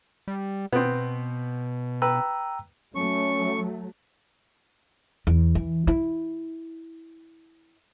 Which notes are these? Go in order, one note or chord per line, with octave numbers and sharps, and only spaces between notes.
G3
B2 B3 C4
B4 G5 A#5 E6
F#3 A3 C#4 C#6
E2
E3
E4